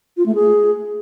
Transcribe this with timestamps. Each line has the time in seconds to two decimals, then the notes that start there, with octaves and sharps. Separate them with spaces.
0.17 F4
0.26 A3
0.35 G#4